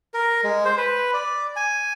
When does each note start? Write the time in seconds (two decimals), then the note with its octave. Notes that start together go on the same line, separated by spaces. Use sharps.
0.14 A#4
0.44 G#3
0.65 C5
0.77 B4
1.13 D5
1.56 G#5